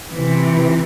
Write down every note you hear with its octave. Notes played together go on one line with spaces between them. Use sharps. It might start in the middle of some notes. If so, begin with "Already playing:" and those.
C3 E3